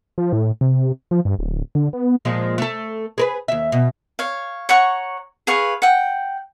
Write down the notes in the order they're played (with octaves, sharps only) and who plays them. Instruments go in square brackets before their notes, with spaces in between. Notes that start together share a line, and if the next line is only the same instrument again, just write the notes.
[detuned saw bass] F3
A2
C3
F3
G2
D1
D3
B3
[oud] A#2 F3 G#3
A3 A4
G#4 A#4 B4
D#2 E5
B2
[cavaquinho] C#5 F5
C#5 F#5 A#5 C#6
G#4 B4 F5 C#6
F#5 G5